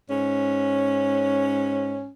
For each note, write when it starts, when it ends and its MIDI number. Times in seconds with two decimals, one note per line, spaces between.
0.09 2.09 44
0.09 2.09 61